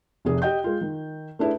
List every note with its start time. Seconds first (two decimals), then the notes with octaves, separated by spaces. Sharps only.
0.25 F1 C3 G#4
0.42 G4 D#5 G5 G6
0.64 G#3 F4
0.81 D#3
1.39 A3 D4 E4 G#4 B4